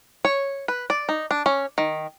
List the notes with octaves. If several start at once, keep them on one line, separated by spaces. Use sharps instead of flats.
C#5
B4
D5
D#4
D4
C#4
D#3